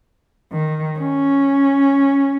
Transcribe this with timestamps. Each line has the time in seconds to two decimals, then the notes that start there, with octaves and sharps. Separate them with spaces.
0.52 D#3
0.99 C#4